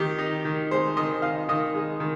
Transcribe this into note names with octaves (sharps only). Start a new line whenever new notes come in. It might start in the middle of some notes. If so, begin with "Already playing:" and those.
Already playing: D#3 G4
D#4
D#3
G#3 C5
D#3 D#5
D#4 F5
D#3 D#5
G#3
D#3